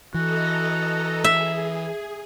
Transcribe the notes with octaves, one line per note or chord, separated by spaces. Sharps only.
E3 F#4 A4 D#5 A#5
G#4 E5